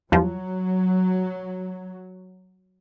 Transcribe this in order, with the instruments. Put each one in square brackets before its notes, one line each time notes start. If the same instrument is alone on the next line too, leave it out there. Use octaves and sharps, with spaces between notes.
[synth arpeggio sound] E2 G2 F3 [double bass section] F#3